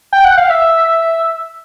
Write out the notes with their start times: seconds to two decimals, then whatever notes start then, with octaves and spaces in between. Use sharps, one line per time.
0.13 G5
0.25 F#5
0.37 F5
0.50 E5